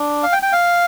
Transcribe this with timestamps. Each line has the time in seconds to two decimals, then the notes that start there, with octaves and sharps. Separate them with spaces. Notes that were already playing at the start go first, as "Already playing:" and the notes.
Already playing: D4
0.23 F5
0.33 G5
0.43 G5
0.52 F5